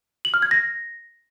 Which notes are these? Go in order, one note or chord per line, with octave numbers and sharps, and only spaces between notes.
F#7
F6
G#6
A#6